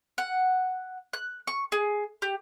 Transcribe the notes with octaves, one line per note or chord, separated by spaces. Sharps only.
F#5
F#6
C#6
G#4
G4